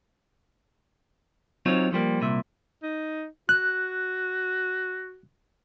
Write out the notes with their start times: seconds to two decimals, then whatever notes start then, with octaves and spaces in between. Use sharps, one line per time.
1.66 F#3 C4 D#4 F4 C#5
1.92 D3 F3 G3 A#3
2.21 C2 A#2 E5
2.83 D#4
3.49 F#4 F#6